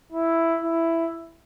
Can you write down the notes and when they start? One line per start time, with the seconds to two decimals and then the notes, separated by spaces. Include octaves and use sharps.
0.12 E4
0.62 E4